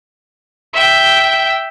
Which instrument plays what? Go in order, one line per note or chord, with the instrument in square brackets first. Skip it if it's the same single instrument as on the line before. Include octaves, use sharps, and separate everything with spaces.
[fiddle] E5 G5